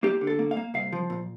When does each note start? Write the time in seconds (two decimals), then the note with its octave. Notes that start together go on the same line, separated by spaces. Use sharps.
0.03 A#3 G4
0.21 D3
0.27 A4
0.39 A#3
0.51 F5
0.57 A#3
0.74 C2 F5
0.92 F3
1.10 A#2